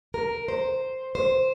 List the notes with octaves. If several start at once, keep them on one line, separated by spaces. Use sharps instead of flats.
A#4
C5
C5